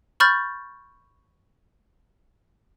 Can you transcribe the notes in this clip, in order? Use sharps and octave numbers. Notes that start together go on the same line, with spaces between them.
B5 C#6 F6 G6 A6